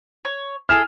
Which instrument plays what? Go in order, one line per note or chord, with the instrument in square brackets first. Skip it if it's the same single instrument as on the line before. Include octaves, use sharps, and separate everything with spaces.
[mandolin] C#5
[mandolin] E4 G#4 A4 [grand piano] F6 E7